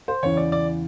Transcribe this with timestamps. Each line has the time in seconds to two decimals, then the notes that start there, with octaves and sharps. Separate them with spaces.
0.08 C5
0.23 E2 C#3 E3 C#5
0.37 D5
0.52 D5